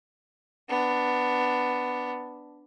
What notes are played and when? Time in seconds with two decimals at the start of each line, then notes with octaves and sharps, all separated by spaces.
0.69 B3 D4